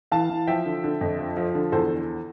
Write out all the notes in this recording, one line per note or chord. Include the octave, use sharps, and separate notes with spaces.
E3 F5 A5
E3
F3 E5 G5
D3
D3
F2
F3
F3
D3
E2 A4 C5